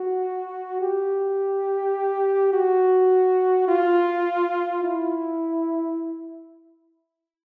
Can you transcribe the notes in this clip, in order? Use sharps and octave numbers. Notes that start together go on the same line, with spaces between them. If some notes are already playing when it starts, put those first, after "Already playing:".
Already playing: F#4
G4
F#4
F4
E4